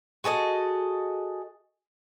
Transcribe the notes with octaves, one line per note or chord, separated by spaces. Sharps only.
F#4 G#4 A4 D#5